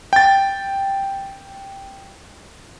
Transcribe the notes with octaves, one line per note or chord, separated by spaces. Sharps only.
G5 A6